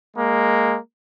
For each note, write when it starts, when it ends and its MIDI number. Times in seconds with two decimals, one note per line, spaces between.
0.16 0.78 56
0.16 0.78 58